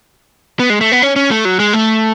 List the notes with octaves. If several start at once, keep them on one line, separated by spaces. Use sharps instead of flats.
B3
G#3
A3
B3
C#4
C#4
A3
F#3
G#3
A3